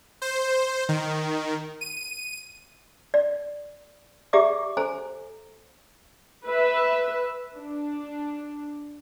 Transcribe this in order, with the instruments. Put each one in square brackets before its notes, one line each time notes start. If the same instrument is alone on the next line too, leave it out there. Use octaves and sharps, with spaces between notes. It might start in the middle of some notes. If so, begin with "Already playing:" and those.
[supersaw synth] C5
D#3
D#7
[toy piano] D5
G4 G#4 D5 E5 A#5 D6
A4 C5 G#5 A#5
[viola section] B4 E5
D4